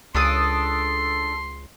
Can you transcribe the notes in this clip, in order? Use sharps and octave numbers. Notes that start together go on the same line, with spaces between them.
C#2 D4 A4 C6 D#6